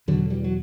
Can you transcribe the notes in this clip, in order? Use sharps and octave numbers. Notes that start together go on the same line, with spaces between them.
E2 B2 D3 F#3
E3 G3
F#3